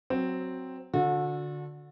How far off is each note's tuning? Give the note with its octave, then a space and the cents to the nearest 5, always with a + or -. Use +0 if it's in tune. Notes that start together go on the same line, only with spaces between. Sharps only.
F#3 +0 C4 +0
D3 +0 F#4 -35 A4 +0